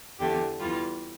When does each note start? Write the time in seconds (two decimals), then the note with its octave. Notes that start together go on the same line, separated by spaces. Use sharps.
0.19 E2 D3 A3 G4
0.60 E2 E3 G3 F4